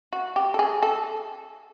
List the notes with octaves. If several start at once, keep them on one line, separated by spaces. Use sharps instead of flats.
F#4
G4
A4
G#4
A4